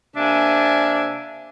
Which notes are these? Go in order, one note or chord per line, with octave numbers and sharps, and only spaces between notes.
C3 A#3 D4 E5 G#5